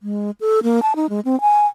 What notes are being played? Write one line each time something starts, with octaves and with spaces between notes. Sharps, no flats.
G#3
A4
A#3
A5
D#4
G#3
C4
G#5